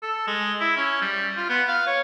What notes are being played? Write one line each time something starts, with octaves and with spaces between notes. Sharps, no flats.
A4
G#3
E4
C#4
G3
F4
B3
F5
C#5